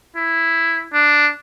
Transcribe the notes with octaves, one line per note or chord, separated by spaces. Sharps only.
E4
D4